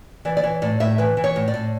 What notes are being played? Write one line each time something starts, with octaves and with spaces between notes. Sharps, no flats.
E3 D5
D5
E3 C#5
A2 D5
A2 E5
E3 B4
E3
C#5
A2
D5
A2